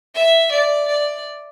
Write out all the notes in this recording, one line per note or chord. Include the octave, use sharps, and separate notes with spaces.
E5
D5
D5